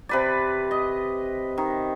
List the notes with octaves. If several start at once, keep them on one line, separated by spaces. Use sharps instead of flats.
C3 B4 D5
D#5
D#3